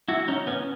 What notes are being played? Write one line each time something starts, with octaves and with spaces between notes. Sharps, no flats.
E4 F#4
C#4 D#4
B3 C#4